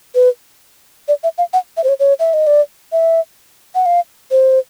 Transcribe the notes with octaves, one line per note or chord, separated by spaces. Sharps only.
B4
D5
E5
F5
F#5
E5
C5
C#5
C#5
E5
D#5
D5
E5
F#5
F5
C5